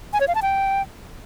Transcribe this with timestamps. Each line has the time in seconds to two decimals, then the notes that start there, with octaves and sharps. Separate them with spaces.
0.13 G#5
0.21 C#5
0.28 F5
0.35 A5
0.42 G5